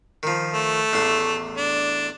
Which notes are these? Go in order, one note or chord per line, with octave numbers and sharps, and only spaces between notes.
D#3 F3
A3
A1 E2 C6
D4